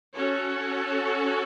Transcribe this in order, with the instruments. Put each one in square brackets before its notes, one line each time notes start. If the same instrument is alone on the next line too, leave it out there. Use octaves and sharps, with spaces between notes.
[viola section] C#4 F#4 A4 C#5